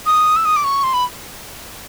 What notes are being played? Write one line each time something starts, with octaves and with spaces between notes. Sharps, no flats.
D#6
E6
D#6
D6
C#6
C6
B5